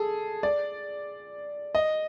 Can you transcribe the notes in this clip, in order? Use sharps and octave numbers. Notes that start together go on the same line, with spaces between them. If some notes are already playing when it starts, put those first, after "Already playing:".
Already playing: G#4 A4
D5
D#5